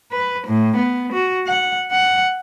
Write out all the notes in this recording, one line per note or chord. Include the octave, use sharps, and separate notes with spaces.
B4
A2
B3
F#4
F#5
F#5